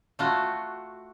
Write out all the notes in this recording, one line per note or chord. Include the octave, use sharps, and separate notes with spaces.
A3 F4 F#4